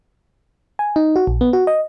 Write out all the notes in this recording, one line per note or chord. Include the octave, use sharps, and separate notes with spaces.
G#5
D#4
F#4
A#1
B3
F#4
D#5